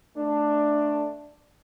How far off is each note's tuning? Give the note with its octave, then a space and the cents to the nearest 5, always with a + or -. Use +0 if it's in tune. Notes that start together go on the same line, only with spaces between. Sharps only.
A3 +0 D4 +10